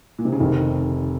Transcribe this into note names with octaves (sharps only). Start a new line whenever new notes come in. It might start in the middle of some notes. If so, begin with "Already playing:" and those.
A#2
C3
C#3
F1 C3 D#3